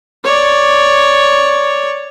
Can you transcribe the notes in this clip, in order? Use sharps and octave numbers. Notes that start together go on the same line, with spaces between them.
C#5 D5